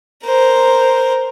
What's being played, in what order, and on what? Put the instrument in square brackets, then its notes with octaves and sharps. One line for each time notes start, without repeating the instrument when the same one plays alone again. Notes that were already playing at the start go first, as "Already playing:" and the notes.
[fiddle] A#4 C5